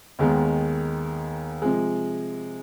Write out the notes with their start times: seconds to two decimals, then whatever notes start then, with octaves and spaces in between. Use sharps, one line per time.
0.19 D#2 D#3 G#3 B3
1.62 C3 F3 G#3